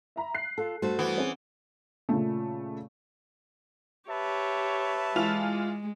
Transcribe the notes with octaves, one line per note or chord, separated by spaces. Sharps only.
E5 A#5 B5
F#6 C7
F4 A4
G2 A3 F#4 A4 C5
E3 B3
C4 C#4 G#4
A#2 C#3 A3
G4 B4 C#5 E5 A5
E3 G#3 F4 F7